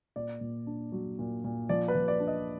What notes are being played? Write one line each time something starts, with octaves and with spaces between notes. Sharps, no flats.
A#2 D5
A#2
D4
F#3
A#2
A#2
F3 D5
B4
F3
D5
D4
D#5